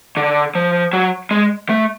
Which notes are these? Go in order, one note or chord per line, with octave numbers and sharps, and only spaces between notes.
D3
F3
F#3
G#3
A3